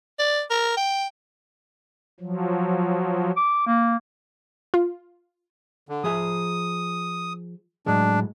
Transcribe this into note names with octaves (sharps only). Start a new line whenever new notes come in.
D5
A#4
G5
F3 F#3
D6
A#3
F4
D3
F3 G#4 E5 D#6
A2 F#3 G#3 D4